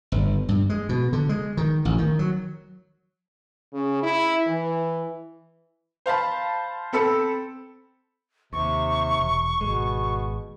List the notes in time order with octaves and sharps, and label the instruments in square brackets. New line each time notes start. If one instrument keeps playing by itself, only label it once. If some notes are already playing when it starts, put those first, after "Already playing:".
[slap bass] G1
G2
G#3
B2
D3
G#3
D#3
A1
D#3
F#3
[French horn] C#3
E4
E3
[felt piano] C5 F5 A5 B5
C4 A4 B5 E6 C#7
[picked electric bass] D#2 [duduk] C3 [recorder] C#6
[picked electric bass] E1
[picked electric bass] G#1 G#3 [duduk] B2